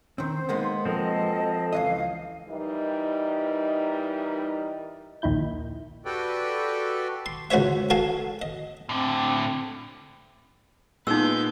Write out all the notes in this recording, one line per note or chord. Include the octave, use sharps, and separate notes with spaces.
D#3 C4 C5
D#3 G#3 A#3 B3
F3 C4 A4 D#5
C#2 E3 D#5 F5
E3 G3 D#4 A#4 D#5
A#1 D#2 D#4 E4 G6
F#4 G4 A4 B4 D5 G5
C6
C#2 F#4 C5 C#5 E5
F#4 G#4 A4 F5 G#5
D#5
A2 D3 C4
A#2 G#3 B3 D#4 B4 E6 G6